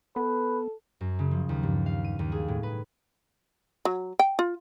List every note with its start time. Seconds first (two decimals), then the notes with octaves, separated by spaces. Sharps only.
0.16 B3 A4 B4
1.01 F#2
1.19 C#3
1.31 F3
1.49 D#2
1.63 G2
1.86 F5
2.04 D#7
2.19 D#2
2.32 G#4
2.48 A2
2.63 B4
3.85 F#3
4.19 G5
4.39 F4